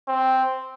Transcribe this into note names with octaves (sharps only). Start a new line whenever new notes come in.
C4